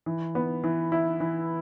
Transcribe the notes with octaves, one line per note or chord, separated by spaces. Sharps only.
E3
B3
E3
E4
E3